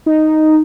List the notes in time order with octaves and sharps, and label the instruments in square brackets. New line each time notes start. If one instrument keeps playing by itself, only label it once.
[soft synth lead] D#4